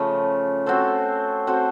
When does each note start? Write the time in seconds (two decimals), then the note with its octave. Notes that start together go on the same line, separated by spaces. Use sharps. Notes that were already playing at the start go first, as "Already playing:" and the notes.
Already playing: C#3 F3 A3
0.66 C4 F#4 A4 C5
1.47 C4 F#4 A4 C5